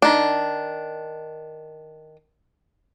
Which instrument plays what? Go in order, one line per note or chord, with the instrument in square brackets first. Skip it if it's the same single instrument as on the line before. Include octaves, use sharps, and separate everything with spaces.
[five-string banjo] D#3 D4